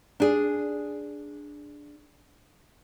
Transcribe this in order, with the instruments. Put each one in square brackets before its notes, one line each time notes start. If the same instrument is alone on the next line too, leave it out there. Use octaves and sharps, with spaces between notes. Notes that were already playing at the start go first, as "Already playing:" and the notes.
[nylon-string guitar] D4 G#4